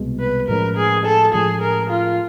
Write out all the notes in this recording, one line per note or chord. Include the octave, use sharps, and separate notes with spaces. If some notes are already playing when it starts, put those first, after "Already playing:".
Already playing: C2 B2 G#3
B4
A2 F3 G#3 C#4 A#4
G#4
A4
A2 F3 G#3 C#4 G#4
A#4
F4